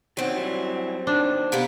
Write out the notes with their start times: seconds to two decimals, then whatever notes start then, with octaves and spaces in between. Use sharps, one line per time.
0.17 D#3 F#3 C4 D#4 F#5
0.35 F#2 G3 E4
1.07 D#3 D4 A4 C5
1.52 C3 A#3 B3